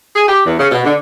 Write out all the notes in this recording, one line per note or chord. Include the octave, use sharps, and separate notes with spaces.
G#4
G4
E2
C#3
B2
D3